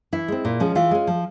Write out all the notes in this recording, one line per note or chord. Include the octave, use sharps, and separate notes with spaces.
E3 E4
G#3 C4
A#2
F3 G#3 C#4
E3 F4
G#3 C#4
F3